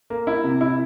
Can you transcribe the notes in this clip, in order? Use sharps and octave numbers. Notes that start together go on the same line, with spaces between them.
A#3
E4
C3
E4